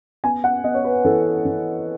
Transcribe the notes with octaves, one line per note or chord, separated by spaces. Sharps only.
B3 G#5
F#5
B3 D#5
C#5
B4
E3 A4
E3